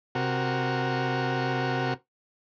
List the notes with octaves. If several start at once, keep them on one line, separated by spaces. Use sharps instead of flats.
C3 F#4 A#4